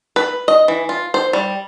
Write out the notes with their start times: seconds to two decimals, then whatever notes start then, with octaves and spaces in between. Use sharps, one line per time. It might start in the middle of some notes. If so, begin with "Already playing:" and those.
0.16 B4
0.48 D#5
0.68 E3
0.89 F4
1.14 C5
1.33 G3